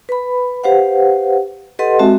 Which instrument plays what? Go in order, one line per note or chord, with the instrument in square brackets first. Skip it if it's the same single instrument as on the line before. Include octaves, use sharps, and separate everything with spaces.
[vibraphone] B4 B5
G4 B4 C5 F5 F#5
G4 A4 B4 D#5 F#5 C6
G#3 C4 F#4 E5 A5